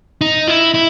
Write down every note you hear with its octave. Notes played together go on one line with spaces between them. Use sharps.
D#4
E4
E4